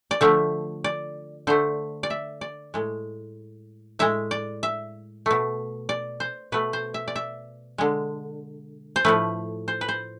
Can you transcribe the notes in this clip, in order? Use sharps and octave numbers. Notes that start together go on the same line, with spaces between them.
D5
D3 F3 A3 E5
D5
D3 A3 C5
D5
E5
D5
A2 G#3
A2 G#3 E5
D5
E5
B2 A3
D5
C5
B2 A3 B4
C5
E5
D5
E5
D3 G#3
C5
A2 F3 A3 B4
C5
B4
C5